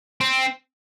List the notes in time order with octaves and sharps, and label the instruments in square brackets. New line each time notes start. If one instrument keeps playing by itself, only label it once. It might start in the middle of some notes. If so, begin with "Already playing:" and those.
[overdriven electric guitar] C4